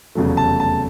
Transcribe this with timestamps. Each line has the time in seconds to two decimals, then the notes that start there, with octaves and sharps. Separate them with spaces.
0.15 F1 E2 C#3 F#3 A3
0.37 A5
0.60 A5